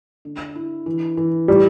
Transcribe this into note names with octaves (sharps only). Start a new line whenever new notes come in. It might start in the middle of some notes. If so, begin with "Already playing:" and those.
D3
E4
E3
E3
A2 G3